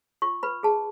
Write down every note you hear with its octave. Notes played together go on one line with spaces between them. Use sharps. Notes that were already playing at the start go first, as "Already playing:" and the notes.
F4 C#6
B4 B5
G#4 A5